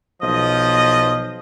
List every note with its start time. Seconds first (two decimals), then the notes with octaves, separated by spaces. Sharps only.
0.22 B1 F3 D#5